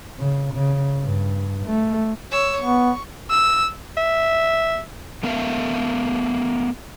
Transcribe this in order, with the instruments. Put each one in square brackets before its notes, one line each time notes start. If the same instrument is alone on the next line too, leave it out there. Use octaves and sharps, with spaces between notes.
[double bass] C#3
C#3
G2
A3
[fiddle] C#5 E6
[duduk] B3 [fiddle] C#6
[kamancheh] E6
[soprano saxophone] E5
[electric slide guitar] A3 B3 A#4 E5 F5